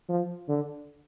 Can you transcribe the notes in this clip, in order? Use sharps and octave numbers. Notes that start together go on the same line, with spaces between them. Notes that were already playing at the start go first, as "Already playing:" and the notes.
F3
D3